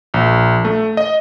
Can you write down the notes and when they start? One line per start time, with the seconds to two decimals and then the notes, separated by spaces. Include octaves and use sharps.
0.14 A#1
0.65 A3
0.97 D#5